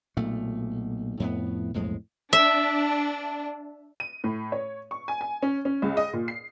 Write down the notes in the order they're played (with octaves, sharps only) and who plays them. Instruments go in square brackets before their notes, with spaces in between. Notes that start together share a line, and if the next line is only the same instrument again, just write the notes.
[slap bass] B1 A#2 A3
F2 A2 B3
B1 F2 A2 G#3
[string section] D4 [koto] E5
[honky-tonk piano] D#7
A2
C#5
C#6
G#5
G#5
C#4
C#4
C#2
D#5
A#2
C7